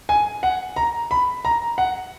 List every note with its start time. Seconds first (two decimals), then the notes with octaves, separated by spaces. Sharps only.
0.09 G#5
0.43 F#5
0.76 A#5
1.11 B5
1.45 A#5
1.78 F#5